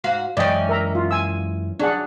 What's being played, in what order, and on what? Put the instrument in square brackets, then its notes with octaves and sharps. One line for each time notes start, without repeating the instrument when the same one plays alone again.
[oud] G#2 F#4 F5
[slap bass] F#2 G#3 [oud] E3 C#4 [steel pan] D5 D#5 G5
[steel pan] A#4 E5 A#5
F4
G#5 E6
[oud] F#3 [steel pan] D4 G#4 F#5